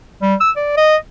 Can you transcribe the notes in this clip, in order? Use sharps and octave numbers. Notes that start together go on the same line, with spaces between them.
G3
E6
D5
D#5